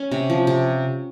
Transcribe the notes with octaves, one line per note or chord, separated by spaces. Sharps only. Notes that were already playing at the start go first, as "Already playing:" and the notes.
Already playing: C#4
C3
F3
C3